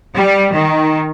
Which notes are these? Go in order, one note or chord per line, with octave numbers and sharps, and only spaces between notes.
G3
D#3